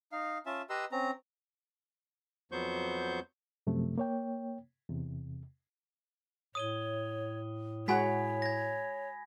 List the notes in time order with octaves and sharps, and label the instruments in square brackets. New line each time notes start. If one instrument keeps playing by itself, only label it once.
[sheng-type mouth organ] D#4 F5
C#4 F4 E5 A5
G4 B4 D#5 A#5 C6 E6
C4 C#4 A#5
[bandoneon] F2 F#3 B3 C5 C#6 G6
[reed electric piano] F#2 C3 F3 A3
A#3 C#5 G5
E2 C3
[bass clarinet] A2 [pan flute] C#5 [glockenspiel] D#6 D#7 G7
[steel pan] G#3 F#4 F#5 [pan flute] C#5 [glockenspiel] G#5 B5 B6
[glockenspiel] G#6 A#6